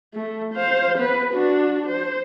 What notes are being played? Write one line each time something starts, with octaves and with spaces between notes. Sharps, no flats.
A3
C5 F5
B3 B4
D4 F#4
C5